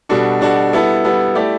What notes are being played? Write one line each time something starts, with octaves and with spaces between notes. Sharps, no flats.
B2 G3 D4 F#4 A4
B2 G3 D4 F#4 A4
G3 B3 E4 A4
G3 B3 E4 A4
A3 E4 G4 D5